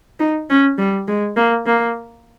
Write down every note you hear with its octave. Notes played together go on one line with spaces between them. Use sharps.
D#4
C#4
G3
G#3
A#3
A#3